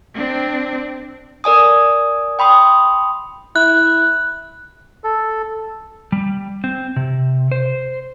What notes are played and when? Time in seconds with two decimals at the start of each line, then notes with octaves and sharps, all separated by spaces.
0.14 C4 D4
1.44 A#4 D5 G#5 D#6
2.39 G5 B5 C6 D#6
3.56 E4 F#6
5.04 A4
6.12 G3
6.64 C4
6.96 C3
7.52 C5